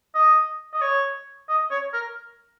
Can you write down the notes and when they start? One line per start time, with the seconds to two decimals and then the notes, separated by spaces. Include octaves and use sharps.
0.15 D#5
0.73 D#5
0.81 C#5
1.49 D#5
1.71 C#5
1.93 A#4